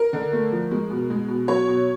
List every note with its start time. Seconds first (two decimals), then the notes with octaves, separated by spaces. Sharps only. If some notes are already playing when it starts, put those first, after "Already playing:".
Already playing: A#4
0.13 D3
0.33 A3
0.52 F3
0.71 G#3
0.90 B2
1.10 G#3
1.29 B2
1.48 F#3 C#5
1.67 B2